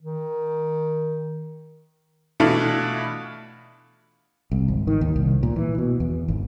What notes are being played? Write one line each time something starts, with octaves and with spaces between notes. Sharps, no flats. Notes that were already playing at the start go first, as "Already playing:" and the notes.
D#3
B2 E3 A3 D4 E4 F4
C2
G#1
D#3
D#2
C2
A#2
E3
B2
E2
G#1